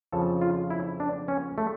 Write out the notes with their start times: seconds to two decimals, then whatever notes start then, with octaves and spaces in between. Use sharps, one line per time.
0.12 F2 C#3 F3 A4
0.41 F4
0.70 E4
1.00 D4
1.28 C#4
1.58 A3